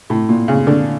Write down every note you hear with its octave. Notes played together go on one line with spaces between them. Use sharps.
A2
A#2
C#3
D3